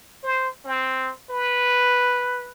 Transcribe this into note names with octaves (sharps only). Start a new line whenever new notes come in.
C5
C4
B4